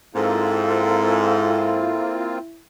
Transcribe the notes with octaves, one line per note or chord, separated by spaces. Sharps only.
G#2 A#3 C4 E4 F4 A4